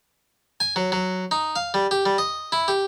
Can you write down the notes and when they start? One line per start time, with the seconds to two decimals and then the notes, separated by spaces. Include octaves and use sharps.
0.60 G#5
0.76 F#3
0.92 F#3
1.31 D#4
1.56 F5
1.74 G3
1.91 G4
2.06 G3
2.18 D#5
2.52 E4
2.68 G4